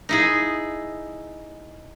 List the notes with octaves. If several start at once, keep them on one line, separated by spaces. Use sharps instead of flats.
D#4 E4 G#4